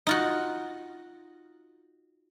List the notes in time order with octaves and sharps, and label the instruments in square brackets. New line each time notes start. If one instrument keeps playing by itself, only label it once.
[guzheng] D#4 F4 F#4